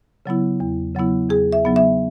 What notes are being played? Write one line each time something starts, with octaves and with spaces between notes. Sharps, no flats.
C#3 F#3 B3 E4
E2
C#3 F#3 B3 E4
E2 G#4
E5
C#3 F#3 B3 D#4
E5